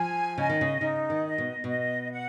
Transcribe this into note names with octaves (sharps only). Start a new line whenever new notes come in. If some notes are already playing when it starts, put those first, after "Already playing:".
Already playing: F3 G#5
C#3 D#5
D#3
C#3
C#3 D#4
D#3
D#5
B2
B2 D#5
F#5